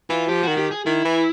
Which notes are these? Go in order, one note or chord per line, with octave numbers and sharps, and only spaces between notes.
E3 F4
F3 G4
D#3 F#4
G4
G#4
D#3 E4
E3